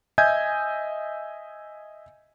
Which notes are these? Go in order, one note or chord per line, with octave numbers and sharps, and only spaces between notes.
D#5 E5 G#5 G6 G#6